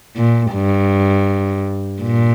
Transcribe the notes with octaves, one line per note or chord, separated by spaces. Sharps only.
A#2
G2
A#2